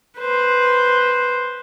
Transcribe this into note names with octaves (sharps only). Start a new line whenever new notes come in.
B4 C5